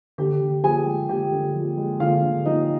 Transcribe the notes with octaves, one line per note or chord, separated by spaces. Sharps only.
D3 G4 G5
D3
F3 G#4 G#5
G#3
D3 G4 G5
D3
F3
G#3
D3 F4 F5
D3
F3 D#4 D#5